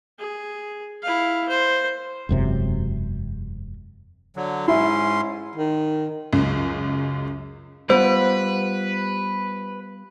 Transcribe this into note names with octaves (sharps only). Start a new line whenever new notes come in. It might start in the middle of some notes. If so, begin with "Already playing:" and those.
G#4
E4 F5
C5
E1 F#2 C3
D3 F#3
G#2 C#4 E4 E5 C6
D#3
C#2 F#2
G3 B3 F4 B4 C5